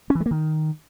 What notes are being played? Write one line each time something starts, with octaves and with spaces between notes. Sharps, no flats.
C#4
E3
G#3
A#3
D#3